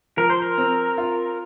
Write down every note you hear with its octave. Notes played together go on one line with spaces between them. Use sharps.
F3 A#4
C5
A#4
C4
F4